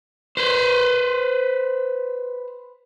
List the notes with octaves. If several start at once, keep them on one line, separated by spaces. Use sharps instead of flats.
B4 C5